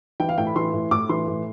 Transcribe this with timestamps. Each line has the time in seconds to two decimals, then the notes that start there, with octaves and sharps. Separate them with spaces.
0.20 E3 G5
0.29 F5
0.38 A2 G5
0.47 B5
0.56 E3 C6
0.73 A2
0.91 A2 D6
1.09 E3 C6
1.27 A2